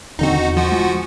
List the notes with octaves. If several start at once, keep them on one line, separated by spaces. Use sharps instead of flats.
D#1 D3 C4 D#4 F#4
E2
F3 F#4
G#3